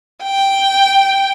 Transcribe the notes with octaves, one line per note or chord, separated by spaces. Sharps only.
G5